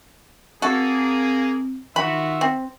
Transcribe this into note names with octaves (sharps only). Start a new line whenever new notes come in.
A#3 C4 F#4 G#4 A4
D#3 F4 F#4 E5 B5
C4